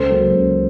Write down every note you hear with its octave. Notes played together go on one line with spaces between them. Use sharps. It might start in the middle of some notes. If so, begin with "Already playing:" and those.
Already playing: C#2 A4 C5
C#3 F#3 A#3
C#2